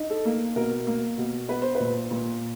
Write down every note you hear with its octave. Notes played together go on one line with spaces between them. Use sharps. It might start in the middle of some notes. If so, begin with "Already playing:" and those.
Already playing: D#4
A4
A#3
B2 A#4
A#3
B2
B3 B4
C5
A#2 B4
A#2